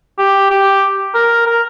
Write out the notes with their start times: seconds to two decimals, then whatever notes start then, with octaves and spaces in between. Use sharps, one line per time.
0.18 G4
0.50 G4
1.14 A#4
1.46 A#4